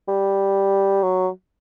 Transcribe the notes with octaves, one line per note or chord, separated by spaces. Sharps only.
G3
F#3